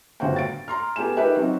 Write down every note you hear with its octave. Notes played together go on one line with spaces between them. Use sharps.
G1 A2 F#4 C5 F5 G5
A6 D7
A#5 C6 F6
A3 B3 G4 G5 G#5 E7
D#4 G4 A#4 B4 E5 G5
F#3 C4 D#4 F#4